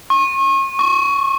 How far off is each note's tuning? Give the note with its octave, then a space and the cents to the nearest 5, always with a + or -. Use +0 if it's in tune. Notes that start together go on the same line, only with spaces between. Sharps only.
C#6 -40
C#6 +15